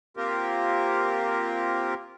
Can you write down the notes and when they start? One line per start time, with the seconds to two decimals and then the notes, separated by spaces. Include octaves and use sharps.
0.17 A#3 C4 F4 G4 A#4